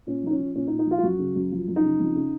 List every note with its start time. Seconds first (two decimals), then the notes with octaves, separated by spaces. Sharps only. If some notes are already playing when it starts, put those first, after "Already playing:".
0.07 A#2 C#4
0.23 F3 D#4
0.31 C#4
0.39 F3
0.55 A#2 C#4
0.67 D#4
0.72 A#2
0.79 D#4
0.87 F3 F4
0.98 F4
1.03 F#2 F#4
1.19 C#3
1.36 F#2
1.52 F3
1.68 F#2
1.76 D#4
1.84 C#3
2.00 F2
2.15 C#3